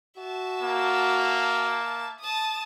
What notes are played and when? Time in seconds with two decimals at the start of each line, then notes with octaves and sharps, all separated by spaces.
0.18 F#4 E5 A5
0.62 A#3
2.20 A5 D#6